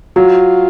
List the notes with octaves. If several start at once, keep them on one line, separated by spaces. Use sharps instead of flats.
F#3 F4